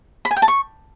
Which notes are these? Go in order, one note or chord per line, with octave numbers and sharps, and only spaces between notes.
B5
G#5
G5
A5
C#6